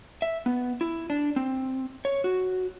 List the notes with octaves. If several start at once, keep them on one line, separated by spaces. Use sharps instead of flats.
E5
B3
E4
D4
C4
C#5
F#4